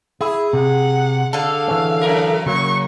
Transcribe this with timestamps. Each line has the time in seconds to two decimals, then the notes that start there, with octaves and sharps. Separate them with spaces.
0.21 E4 G#4
0.53 C3 F#5
1.33 D3 A4 F5
1.68 E3 C#4
2.01 F#2 A#4
2.46 C#3 F#3 A#3 C#6